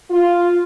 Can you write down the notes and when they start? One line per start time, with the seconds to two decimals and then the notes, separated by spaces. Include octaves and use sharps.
0.11 F4